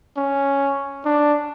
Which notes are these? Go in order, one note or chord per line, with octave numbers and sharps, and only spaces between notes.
C#4
D4